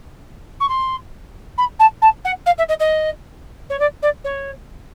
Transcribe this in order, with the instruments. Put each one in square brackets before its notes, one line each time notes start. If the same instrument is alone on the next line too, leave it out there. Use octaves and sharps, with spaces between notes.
[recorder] C#6
C6
B5
A5
A5
F#5
F5
E5
D#5
D#5
C#5
D5
D5
C#5